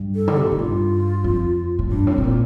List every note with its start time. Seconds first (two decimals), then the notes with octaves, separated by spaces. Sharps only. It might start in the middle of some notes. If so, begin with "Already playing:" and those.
Already playing: G2
0.15 A4
0.28 D3
0.36 C3 G4
0.44 A#2
0.50 A2 D#4
0.59 G2 F4
1.24 F2
1.79 A2
1.91 G2 D4
2.07 A2
2.13 C4
2.18 A2
2.24 A#2